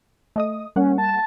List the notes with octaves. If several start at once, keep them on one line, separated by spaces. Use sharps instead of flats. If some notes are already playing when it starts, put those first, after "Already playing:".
A3 D#5 D#6
G3 A#3 C#4 F#5
A5